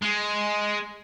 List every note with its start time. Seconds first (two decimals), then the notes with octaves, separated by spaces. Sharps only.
0.02 G#3